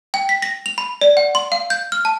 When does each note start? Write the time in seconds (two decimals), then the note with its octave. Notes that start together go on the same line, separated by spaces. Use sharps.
0.14 G5
0.29 B6
0.42 A#6
0.66 F7
0.78 B5
1.01 D5
1.17 F#5
1.35 C6
1.52 F5
1.70 G6
1.92 F6
2.05 A5